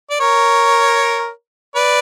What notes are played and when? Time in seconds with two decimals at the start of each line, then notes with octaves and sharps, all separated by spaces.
0.10 D5
0.19 A#4 C#5
1.76 B4 D5